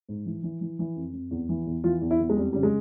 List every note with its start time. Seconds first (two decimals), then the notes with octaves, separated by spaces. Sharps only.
0.09 G#2
0.26 E3
0.43 E3
0.61 E3
0.79 E3
0.96 F2
1.14 F2
1.31 E2
1.49 E3
1.66 E2
1.84 E3 F4
2.01 E2
2.11 E4
2.19 E2
2.29 G#3
2.37 F2 G3
2.53 C#3 G3
2.63 G#3